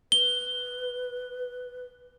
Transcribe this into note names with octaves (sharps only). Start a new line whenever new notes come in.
B4 G7